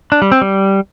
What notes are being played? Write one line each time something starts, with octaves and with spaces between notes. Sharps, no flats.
D4
G3
C4
G3